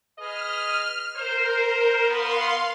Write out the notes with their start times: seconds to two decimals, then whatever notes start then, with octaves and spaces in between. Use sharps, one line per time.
0.19 G#4 B4 D#5 F6
1.17 A#4 C5
2.08 B3 F5 C6